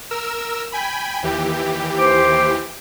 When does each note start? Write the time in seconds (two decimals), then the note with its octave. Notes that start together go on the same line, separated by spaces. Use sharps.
0.11 A#4 E6
0.72 G5 G#5 B5
1.23 D#2 E3 G4
1.98 C5 D6